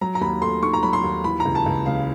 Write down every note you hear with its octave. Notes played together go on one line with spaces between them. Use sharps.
F#3 A#5
A#5
D#2 B5
A3 C6
D#3 C#6
A#5
F#3 B5
C6
D#2
E3 B5
A#5
C#2
A5
C#2
C#3 F5